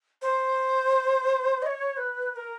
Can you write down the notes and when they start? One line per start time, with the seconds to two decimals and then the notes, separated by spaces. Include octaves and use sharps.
0.22 C5
1.62 D#5
1.66 C#5
1.97 B4
2.32 B4
2.36 A#4